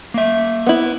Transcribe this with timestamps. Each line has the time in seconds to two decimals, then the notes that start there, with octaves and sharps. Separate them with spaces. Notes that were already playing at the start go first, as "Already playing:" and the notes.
0.14 A#3 E5
0.66 B3 E4